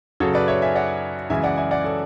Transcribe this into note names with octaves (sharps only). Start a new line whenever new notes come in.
F#2 C#3 F#3 A4 C#5
B4 D5
C#5 E5
E5 G#5
D5 F#5
F#2 C#3 E3 G#3 E5 G#5
D5 F#5
E5 G#5
D5 F#5
A4 C#5